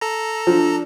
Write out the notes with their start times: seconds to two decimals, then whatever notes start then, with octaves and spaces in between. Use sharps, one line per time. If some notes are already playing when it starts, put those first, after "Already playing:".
0.01 A4 A#5
0.47 F3 D4